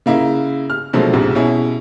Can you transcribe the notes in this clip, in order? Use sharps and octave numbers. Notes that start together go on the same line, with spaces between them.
C#3 A#3 E4
F6
B2 D3 F3 F#3 G#3 A3
A#1 G#2 C3
B2 C#4 E4 G#4